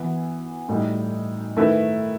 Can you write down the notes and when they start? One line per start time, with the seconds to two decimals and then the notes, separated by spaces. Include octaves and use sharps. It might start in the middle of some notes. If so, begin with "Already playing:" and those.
Already playing: E3 B3 E4
0.69 A2 G3 D#4
1.56 D#3 A3 E4 B4